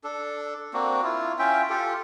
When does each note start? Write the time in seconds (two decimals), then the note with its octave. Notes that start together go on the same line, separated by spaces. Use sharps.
0.04 D4 A4
0.74 A#3 C4 D4 F#4
1.03 E4 F4
1.39 C#4 F4 E5 G5
1.69 F4 G4 A4